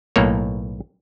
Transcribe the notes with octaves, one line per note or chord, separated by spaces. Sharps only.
B1 A2 A#3 C#5